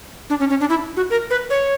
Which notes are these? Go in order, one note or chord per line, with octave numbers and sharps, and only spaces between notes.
D4
C#4
C#4
D4
E4
F#4
A#4
B4
C#5